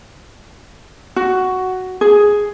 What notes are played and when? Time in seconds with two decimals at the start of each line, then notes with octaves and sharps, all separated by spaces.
1.16 F#4
2.01 G#4